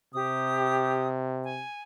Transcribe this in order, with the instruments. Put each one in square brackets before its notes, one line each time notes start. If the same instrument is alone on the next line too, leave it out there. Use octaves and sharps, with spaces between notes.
[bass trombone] C3 [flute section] G4 D#6
[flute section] G#5